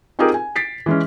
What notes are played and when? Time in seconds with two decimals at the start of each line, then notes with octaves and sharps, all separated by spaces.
0.19 C4 D#4 F4 G4 G#4 A#4
0.34 G#5
0.56 A6 B6 C7 D7
0.86 E3 G#3 C#4